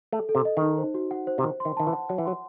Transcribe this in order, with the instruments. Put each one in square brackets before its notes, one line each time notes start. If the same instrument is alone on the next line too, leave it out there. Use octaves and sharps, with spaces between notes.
[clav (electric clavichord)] A3 [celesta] A4
[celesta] A4
[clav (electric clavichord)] C3
[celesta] D#5
[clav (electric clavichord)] D#3
[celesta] D#4
C5
F#4
F#5
C5
[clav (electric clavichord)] C3
[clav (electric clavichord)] D#3 [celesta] C5
[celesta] C6
[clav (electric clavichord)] D#3
[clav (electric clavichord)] D#3 [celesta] A5
[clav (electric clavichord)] E3
[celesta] F#5
[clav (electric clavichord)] F#3 [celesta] F#5
[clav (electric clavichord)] E3
[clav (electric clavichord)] F#3 [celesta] C6